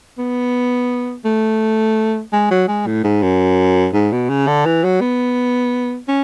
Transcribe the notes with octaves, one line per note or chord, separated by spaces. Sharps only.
B3
A3
G#3
F#3
G#3
A2
G#2
F#2
G#2
B2
C#3
D3
E3
F#3
B3
C#4